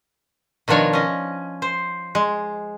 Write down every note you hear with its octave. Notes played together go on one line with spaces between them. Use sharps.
B2 D#3 F3 D4 C#5
C#4 D#5
C5
G#3